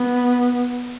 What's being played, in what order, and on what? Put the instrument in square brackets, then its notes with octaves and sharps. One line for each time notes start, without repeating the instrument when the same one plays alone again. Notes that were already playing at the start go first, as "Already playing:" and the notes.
Already playing: [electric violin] B3